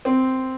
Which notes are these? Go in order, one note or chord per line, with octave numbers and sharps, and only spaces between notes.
C4